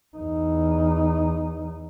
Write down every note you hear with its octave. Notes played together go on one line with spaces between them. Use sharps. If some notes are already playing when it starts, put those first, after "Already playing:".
E2 D#4